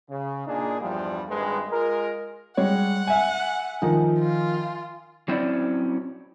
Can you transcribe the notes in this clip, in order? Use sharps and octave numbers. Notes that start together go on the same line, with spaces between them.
C#3
A#2 A#3 D4 D#4 G#4
E2 G2 F3 G3
G#1 G2 G#3 A#4 B4
G#3 F4 A#4
G3 G#3 C#5 F#5
E5 G#5
D#3 F3 D#4
F4
F#3 C4 C#4 E4 C#5 D5